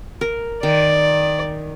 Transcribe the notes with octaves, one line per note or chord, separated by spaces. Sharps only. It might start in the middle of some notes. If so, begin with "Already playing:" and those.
A#4
D#3 D5